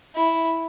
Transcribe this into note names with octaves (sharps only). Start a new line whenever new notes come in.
E4